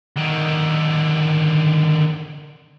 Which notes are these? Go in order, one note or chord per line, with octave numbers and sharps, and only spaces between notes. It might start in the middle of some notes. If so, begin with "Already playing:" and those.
D3 D#3